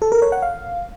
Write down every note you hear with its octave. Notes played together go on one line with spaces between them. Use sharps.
A4
A#4
C#5
F#5
F5